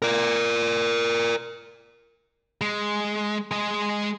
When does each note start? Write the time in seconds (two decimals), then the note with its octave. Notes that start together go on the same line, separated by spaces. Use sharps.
0.02 A#4 D5
2.61 G#3
3.51 G#3 D#5